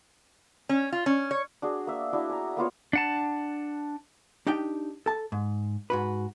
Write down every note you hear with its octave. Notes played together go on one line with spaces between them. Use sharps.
C#4
F4
C#4
C#5
D4 F#4 G#4
A#3 E5
D4 E4 F#4
G#5 A#5
A#3 B3 F4 C#5
D4 F#5 A5
D4 D#4 G4 G5
A4 A5
G#2
G#2 F#4 B4